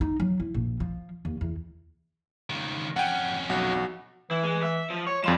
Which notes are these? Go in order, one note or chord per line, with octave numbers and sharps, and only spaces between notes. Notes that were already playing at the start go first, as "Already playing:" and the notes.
D#4
F#3
E4
A#1
F3
D#2
E2
C#2 D#3
F2 C#4 F#5 G5
B1 F#4
E3 E4
G#3
E5
F3
C#5 C#6
F2 F3 G#3 D4 C6 E7